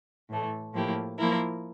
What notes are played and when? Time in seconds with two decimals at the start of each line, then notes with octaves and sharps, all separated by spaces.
0.29 A2 E3 A3
0.73 A2 F3 A#3 E4 G4
1.18 F3 A#3 E4 A#4